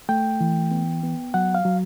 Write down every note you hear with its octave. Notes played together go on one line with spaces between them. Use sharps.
A3 G5
E3
B3
B3
F#3 F#5
F5
F#3